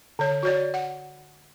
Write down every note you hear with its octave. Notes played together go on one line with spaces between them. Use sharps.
D3 C#5
F#4 C#5 D5
F#5